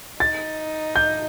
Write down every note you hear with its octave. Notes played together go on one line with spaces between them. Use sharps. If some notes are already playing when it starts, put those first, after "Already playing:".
D#4 A6
G6